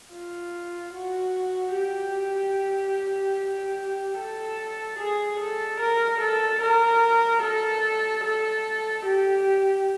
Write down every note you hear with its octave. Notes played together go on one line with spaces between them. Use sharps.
F4
F#4
G4
A4
G#4
A4
A#4
A4
A#4
A4
A4
G4